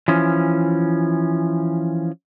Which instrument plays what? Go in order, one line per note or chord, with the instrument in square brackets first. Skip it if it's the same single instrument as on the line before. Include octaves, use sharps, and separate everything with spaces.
[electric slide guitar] E3 F3 C#4